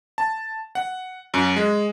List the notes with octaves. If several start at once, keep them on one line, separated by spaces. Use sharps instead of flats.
A5
F#5
F#2
G#3